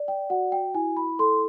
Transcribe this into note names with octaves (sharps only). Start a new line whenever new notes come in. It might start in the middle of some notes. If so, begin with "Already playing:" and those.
Already playing: D5
G5
F#4 F#5
G5
E4 G#5
B5
A4 C6